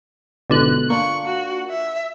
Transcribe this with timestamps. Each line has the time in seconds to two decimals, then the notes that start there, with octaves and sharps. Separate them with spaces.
0.50 G1 G#2 B2 D3 F#6
0.90 A#3 D4 F4 C#6
1.26 F#4
1.70 E5